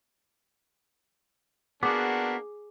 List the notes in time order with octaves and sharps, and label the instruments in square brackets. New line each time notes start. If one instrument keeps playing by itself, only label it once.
[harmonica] A#3 D4 [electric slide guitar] B3 F#4 [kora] G#4 [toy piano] D6